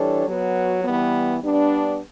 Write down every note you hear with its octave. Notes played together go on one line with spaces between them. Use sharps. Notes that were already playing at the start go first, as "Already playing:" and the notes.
Already playing: E3 G3 D4 A4 C#5
F#3 B3 F#4
E3 G3 B3
G3 B3 D4